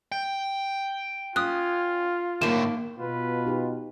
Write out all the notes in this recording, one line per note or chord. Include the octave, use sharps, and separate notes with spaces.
G5
C#4 F4 D#6 F#6
A2 D3 D#3 A#3 E7
B2 F4 B4
D#4 G4